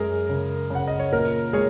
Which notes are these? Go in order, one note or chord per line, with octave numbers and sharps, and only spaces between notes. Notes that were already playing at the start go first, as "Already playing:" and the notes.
Already playing: F#2 G#3 G#4 A#4
C#3
C#3 F#5
D#5
C#5
A#2 A#4
G#3 G#4 C#5